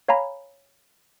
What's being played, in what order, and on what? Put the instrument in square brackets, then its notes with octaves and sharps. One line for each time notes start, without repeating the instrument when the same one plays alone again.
[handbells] C#5 F5 G#5 A#5 B5